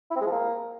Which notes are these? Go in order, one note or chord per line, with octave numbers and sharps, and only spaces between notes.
E4
C4
G#3
F3
A#3